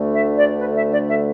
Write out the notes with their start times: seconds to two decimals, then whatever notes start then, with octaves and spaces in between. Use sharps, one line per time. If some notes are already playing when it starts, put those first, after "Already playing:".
Already playing: D2 D3 A3
0.13 E5
0.37 D5
0.59 B4
0.75 E5
0.92 D5
1.09 E5